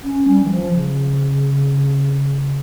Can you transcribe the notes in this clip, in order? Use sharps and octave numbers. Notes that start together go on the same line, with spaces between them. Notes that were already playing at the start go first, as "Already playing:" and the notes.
C#4
G3
E3
F3
C#3